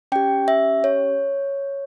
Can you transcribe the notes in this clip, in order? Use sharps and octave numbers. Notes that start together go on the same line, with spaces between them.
C#4 G4 G5
E5
C#5